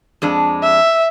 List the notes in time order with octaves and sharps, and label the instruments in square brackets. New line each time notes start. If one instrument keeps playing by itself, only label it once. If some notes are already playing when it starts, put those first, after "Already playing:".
[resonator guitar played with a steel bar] F2 G#3 D4
[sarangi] E5